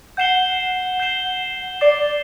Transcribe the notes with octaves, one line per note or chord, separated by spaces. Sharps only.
F#5 G6 C7 E7 G7
G6 C7 E7 G7
D5 D6 A6 C7 E7 G7